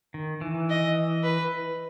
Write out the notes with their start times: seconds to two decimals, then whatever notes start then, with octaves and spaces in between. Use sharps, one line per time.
0.14 D#3
0.41 E3
0.70 D#5
1.23 B4